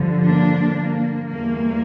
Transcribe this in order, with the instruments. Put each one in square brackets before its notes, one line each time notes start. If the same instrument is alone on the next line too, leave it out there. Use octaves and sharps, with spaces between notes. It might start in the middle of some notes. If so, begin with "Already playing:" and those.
Already playing: [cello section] G2 D3 F3
A#3 D4
A#3
E2 E3 G3 A#3